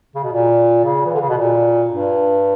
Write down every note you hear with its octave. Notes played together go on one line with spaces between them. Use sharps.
C#3
B2
A#2
C#3
E3
D3
C#3
B2
A#2
G2